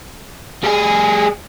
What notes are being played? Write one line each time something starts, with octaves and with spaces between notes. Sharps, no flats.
G3 G#4